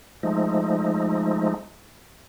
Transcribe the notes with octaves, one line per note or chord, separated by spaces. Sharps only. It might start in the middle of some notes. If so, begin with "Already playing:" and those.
F3 G#3 A3 D#4